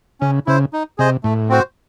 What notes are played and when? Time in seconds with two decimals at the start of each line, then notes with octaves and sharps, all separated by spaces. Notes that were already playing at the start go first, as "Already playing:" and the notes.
0.21 C#3 C#4
0.46 C#3 E4 C5
0.73 D#4
0.98 C3 G#4 C5 D#5
1.24 A2 A3
1.49 C4 F#4 C5